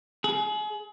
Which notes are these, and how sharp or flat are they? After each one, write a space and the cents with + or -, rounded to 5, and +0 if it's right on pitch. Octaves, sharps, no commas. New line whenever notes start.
G#4 +35